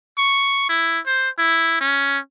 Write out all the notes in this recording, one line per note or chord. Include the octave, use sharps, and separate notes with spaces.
C#6
E4
C5
E4
C#4